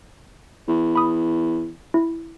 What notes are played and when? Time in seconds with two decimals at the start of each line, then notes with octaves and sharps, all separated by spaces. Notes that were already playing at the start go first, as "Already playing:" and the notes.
0.68 E2
0.96 B5 D#6
1.94 E4